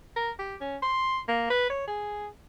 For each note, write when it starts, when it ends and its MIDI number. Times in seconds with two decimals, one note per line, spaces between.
0.16 0.31 70
0.39 0.55 67
0.61 0.77 61
0.82 1.19 84
1.28 1.48 58
1.50 1.68 71
1.70 1.86 73
1.88 2.27 68